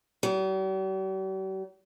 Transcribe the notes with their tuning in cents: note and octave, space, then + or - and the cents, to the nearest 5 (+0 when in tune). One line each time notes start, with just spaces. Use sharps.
G3 -45